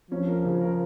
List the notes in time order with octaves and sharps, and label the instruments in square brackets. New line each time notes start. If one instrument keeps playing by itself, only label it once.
[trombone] F3 [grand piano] C#4
[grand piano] A#4
C#3
A#4